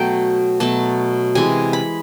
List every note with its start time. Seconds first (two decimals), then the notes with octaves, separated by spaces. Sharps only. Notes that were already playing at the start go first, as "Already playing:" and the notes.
Already playing: B2 F#3 A3 G5
0.60 B2 F#3 A3 A5
1.35 C3 E3 G#3 G#5
1.73 B5